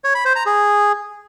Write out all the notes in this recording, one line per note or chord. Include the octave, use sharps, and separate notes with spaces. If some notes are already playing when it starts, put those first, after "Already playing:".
C#5
B5
C5
A#5
G#4